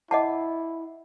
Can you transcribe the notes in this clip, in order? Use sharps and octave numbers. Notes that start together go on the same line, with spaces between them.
E4 D#5 F#5 A5